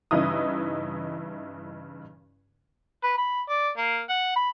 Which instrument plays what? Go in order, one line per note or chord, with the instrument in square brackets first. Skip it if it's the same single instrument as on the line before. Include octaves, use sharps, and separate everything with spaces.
[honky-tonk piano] G2 C#3 E3 D#4 E4 D#6
[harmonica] B4
B5
D5
A#3
F#5
B5